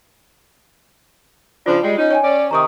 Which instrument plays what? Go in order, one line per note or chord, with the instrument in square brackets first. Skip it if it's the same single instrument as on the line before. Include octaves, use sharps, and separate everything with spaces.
[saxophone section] C#3 F3 D4 [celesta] F4
[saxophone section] G3 G#3
C#4 D#4
[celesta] C#5 G5 G#5
[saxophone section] C#4 D5
[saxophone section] C3 D#3 [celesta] A#5 C#6 D#6